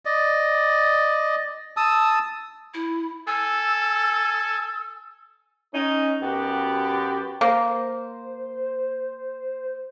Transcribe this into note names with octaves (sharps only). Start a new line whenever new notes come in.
D5 D#5
A5 D#6 E6
E4
A4 G#5 E6
C#4 D#4
F#2 B3 F#4 G4
A#3 C5